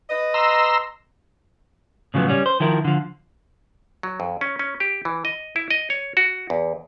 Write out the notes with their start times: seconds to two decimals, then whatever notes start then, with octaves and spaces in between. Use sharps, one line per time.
0.10 B4 D#5
0.34 A#5 C6 E6
2.14 A2 C#3 F3 F#3 B3
2.29 G3 C#4
2.46 C5
2.60 D#3 F3 E4 A#4
2.85 D3 F3
4.03 F#3
4.20 F2
4.41 C#4
4.59 C#4
4.80 G4
5.05 E3
5.25 D#5
5.56 E4
5.70 D#5
5.90 C#5
6.17 F#4
6.50 E2